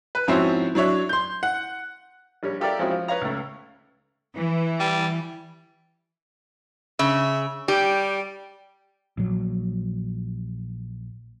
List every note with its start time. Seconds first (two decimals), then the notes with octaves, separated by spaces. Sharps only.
0.15 B4
0.27 G#2 F3 C4 C#4 E4 F#4
0.75 F#3 D4 C#5 E5
1.09 C6 G6
1.43 F#5
2.43 A#1 G3 C#5
2.60 F4 G4 A4 A#4 D5 E5
2.79 F3 G#3 C4 C#4 E4 F#4
2.91 F3
3.08 B4 C#5 F5 A#5
3.21 C#2 A3
4.36 E3
4.80 G3
6.99 C#3 E5
7.68 G3 G4
9.18 A#1 F#3